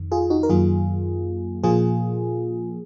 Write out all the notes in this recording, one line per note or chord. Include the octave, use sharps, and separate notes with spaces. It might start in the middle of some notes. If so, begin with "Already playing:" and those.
Already playing: F2 D#3
F4 G#4
D#4 F#4
A#4
F#2 D#3 F#3 A#3 F4 G#4
A#2 F3 A#3 F4 G#4